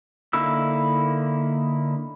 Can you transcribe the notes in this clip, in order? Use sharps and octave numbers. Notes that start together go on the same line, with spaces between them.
D3 A#3 D#4 E4 E6